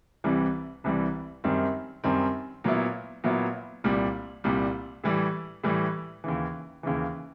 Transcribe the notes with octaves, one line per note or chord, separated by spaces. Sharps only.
C2 C3 E3 G3
C2 C3 E3 G3
F#2 D#3 G3 C4
F#2 D#3 G3 C4
A#2 F#3 B3 E4
A#2 F#3 B3 E4
C2 A#2 G3
C2 A#2 G3
A2 E3 G3
A2 E3 G3
D#2 C#3 E3
D#2 C#3 E3